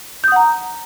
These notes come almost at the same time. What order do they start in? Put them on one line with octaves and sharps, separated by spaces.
G6 D#6 F#5 A#5